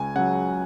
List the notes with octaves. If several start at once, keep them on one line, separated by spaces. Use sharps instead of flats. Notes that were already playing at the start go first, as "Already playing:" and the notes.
Already playing: C#2 G#5
C#3 F#3 F#5